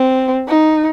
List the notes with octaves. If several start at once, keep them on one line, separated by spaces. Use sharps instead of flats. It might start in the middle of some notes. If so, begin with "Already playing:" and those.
Already playing: C4
D#4